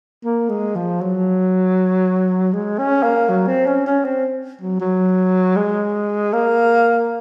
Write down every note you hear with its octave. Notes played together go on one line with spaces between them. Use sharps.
A#3
G#3
F3
F#3
G#3
C#4
A#3
F#3
C4
C#4
C#4
C4
F#3
F#3
G#3
A#3